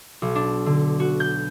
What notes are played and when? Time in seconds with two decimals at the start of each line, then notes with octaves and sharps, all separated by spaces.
0.22 B1
0.35 D4
0.66 D3
1.00 F#4
1.20 G6